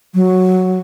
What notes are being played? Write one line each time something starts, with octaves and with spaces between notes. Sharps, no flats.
F#3